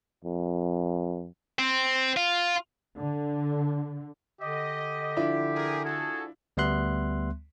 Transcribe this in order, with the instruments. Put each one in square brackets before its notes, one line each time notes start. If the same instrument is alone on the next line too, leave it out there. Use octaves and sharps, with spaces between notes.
[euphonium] F2
[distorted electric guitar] C4
F4
[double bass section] D3
[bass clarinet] D3 [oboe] G4 [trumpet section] D#5
[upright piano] F3 D4 E4
[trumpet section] G#4 A#4
[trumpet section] F#4 A4 [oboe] G#4
[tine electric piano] D2 G3 B3 E5 C6 F#6